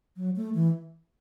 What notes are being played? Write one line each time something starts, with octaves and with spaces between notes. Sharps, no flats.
F#3
A3
E3